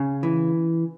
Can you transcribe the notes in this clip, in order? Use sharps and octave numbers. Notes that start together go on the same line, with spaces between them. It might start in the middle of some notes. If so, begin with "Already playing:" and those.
Already playing: C#3
E3